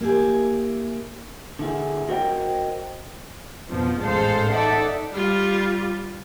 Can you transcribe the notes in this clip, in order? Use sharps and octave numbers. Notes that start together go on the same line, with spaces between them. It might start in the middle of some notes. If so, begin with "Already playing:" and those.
A#3 E4 G4 G#4
D3 E4 G#4
F#4 A#4 C5 D#5 G5
F2 B2 F3 B3 D4
A1 G#2 G#3 A4 C5 F5
D#4 A4 D5 E5 F#5
G3 F4